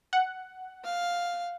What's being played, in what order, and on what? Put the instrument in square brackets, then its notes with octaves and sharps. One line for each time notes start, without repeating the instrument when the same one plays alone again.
[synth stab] F#5
[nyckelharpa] F5